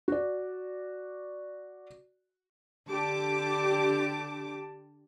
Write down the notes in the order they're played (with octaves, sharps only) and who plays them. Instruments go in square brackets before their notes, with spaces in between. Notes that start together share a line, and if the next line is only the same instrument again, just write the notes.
[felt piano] F#4 D5
[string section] D3 G4 A5 D6